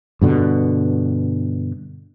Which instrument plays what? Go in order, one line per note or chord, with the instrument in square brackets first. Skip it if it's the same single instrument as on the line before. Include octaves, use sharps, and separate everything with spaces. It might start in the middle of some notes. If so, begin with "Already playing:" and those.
[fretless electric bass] G2 B2 D3